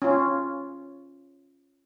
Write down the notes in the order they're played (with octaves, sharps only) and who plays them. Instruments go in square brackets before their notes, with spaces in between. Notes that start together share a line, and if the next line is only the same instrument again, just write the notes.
[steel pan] C#4 F4